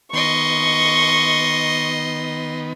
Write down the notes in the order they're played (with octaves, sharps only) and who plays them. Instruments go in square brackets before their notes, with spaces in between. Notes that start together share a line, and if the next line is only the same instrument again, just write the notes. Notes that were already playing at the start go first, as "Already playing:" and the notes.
[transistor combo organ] D#3 B3 [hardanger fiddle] D#5 C6 [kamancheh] C#6